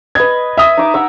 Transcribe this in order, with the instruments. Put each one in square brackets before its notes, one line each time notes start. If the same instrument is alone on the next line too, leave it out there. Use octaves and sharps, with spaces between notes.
[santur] B4 D#5 [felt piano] G#6
[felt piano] E5 D#6
[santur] D#4 D6
E5 F#5 A#5